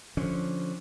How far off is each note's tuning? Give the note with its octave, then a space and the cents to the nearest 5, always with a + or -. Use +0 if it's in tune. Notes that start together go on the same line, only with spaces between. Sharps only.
D3 +0 F3 +0 C#4 +0